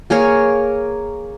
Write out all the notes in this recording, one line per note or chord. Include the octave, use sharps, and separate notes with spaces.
A#3 G#4 A#4 C#5